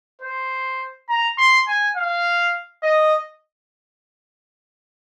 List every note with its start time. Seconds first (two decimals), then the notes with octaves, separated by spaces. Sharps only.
0.22 C5
1.09 A#5
1.38 C6
1.67 G#5
1.96 F5
2.83 D#5